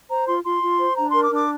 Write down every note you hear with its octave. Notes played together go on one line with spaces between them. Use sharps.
C5 A#5
F4 C6
F4 C6
F4
C5
D4 A#5
A#4 C6
D6
D4
D6